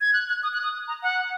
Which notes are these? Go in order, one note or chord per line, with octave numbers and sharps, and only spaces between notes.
G#6
F#6
F#6
D#6
F#6
D#6
A#5
F#5